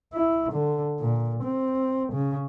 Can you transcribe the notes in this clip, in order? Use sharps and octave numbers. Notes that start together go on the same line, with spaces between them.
E4
D3
A#2
C4
C#3